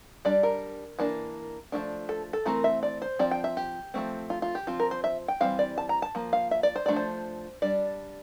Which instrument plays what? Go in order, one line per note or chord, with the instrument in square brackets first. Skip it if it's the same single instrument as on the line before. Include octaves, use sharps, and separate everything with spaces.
[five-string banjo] G3 D4 D5
A#4
E3 A#3 D4
F3 A3 D4
A4
A4
E3 A3 C4 A#4
E5
D5
C5
F3 C4 D5
G5
E5
G4
F3 A3 C4
F4
F4
G4
F3 C4 F4
A#4
C5
E5
G5
E3 G3 C4 F5
D5
A5
A#5
A5
F3 A#3
F5
E5
D5
C5
F3 A3 D4 D5
C5
G3 D4 D5